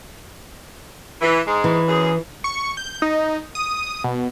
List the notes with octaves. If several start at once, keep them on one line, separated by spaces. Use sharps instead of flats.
E3
G#2 G#3
E3
F#2 G#4
C#6
G6
D#4
D#6
B2